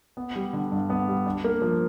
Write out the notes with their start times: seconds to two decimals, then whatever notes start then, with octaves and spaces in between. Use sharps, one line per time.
0.17 B3
0.36 G3
0.53 D3
0.72 G2
0.90 B3
1.08 G3
1.26 D4
1.44 A#3
1.62 F3